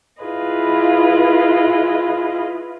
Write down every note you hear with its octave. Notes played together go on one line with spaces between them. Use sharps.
E4 F4 G#4 B4 D#5